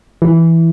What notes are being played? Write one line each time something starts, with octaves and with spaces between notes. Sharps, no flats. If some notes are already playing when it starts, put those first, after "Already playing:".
E3